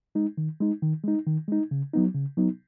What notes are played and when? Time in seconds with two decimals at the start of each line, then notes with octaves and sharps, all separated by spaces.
0.15 G#3 D#4
0.38 D#3
0.60 G#3 D#4
0.82 D#3
1.04 G#3 D#4
1.26 D#3
1.48 G#3 D#4
1.71 C#3
1.93 F#3 B3 D#4
2.14 C#3
2.37 F#3 B3 D#4